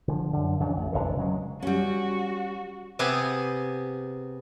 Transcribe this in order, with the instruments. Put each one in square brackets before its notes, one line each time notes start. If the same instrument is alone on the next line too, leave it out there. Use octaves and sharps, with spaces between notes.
[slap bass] D3 E3 F3
F#2 D3
F2 C#3 E3 D4
A1
F1 A#1 D3 E3
C#3 F#3 G#3
[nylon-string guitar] G3 C#4 [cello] F#4
[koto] C3 B3 G4 G#4 G#5